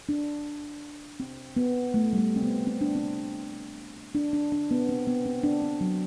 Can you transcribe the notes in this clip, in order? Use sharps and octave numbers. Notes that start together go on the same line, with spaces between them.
D4
C4
B3
A3
G3
A3
C4
B3
C4
D4
C4
D4
D4
D4
B3
C4
B3
C4
D4
C4
F#3